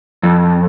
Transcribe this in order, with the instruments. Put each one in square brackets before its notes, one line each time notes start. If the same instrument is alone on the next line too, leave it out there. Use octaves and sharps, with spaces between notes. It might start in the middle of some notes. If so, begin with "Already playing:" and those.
[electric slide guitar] F2